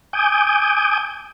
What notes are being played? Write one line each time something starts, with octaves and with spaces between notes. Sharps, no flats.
G#5 D6 D#6 G6